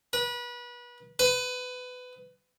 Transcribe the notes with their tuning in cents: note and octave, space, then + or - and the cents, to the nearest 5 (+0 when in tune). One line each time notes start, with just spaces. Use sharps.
B4 -30
B4 +20